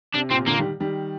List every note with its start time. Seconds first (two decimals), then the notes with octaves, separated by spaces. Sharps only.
0.15 C3 D4
0.31 A#2 C4
0.39 C3
0.47 A#2 D3 A#3
0.58 D#3 G3
0.80 D#3 G3